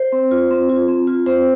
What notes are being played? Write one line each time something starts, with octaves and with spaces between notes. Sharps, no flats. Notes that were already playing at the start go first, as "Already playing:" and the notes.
Already playing: C5
C4
F4
C4
F4
C4
F4
C4 C5